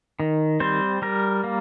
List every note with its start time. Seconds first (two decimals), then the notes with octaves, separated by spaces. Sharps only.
0.20 D#3
0.60 G3 C4 C5
1.02 G3 A#4
1.44 A#3